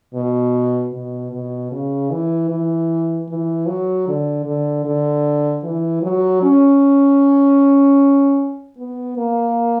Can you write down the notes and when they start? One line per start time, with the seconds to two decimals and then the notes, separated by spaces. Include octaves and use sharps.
0.14 B2
0.93 B2
1.32 B2
1.72 C#3
2.11 E3
2.50 E3
3.29 E3
3.68 F#3
4.08 D3
4.46 D3
4.85 D3
5.63 E3
6.03 F#3
6.43 C#4
8.78 B3
9.17 A#3